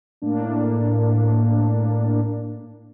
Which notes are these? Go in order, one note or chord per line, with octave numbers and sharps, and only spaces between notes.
A2 A#3 D4